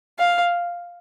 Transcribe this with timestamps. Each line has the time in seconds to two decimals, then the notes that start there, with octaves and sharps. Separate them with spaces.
0.19 F5